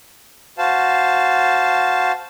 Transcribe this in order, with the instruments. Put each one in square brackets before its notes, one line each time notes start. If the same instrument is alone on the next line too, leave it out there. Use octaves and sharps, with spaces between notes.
[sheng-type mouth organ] F#4 C5 F5 A5